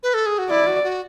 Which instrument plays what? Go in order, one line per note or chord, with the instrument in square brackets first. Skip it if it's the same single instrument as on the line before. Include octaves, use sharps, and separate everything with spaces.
[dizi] B4
A4
G#4
F#4
[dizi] E4 [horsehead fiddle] D5
[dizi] F#4
F#4